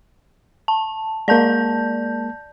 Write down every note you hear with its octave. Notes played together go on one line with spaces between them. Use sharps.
A5
G#3 A#3 D5 A5 G6